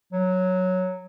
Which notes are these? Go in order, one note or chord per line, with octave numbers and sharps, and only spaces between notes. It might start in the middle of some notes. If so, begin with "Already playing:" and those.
F#3